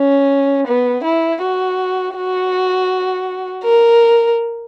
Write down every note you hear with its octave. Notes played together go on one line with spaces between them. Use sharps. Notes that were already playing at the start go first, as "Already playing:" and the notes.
Already playing: C#4
B3
E4
F#4
F#4
A#4